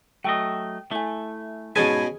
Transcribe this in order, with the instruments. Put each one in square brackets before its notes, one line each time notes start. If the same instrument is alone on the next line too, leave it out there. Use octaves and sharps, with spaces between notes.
[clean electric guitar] F#3 A3 D#5 [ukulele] G5
[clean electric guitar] A3 [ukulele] E4 G#5
[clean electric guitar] G#2 B4 A5 [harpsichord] B2 C#4 G#5 [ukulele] G#4